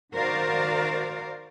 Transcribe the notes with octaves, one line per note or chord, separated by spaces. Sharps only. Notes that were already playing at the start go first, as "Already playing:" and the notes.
D#3 F#4 A#4 C5 D5 F5